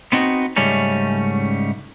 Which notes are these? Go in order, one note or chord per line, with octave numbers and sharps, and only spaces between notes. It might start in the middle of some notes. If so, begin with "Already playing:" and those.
B3 C4 D#4 F#4
G#2 C#3 G3 A3 C#4